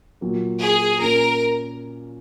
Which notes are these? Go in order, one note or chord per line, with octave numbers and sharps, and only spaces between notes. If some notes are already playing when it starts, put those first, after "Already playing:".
A#2 F#3 A#3
G#4
A#2 A#3 C#4 A#4